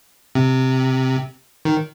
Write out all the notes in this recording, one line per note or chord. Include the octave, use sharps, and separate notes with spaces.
C3
D#3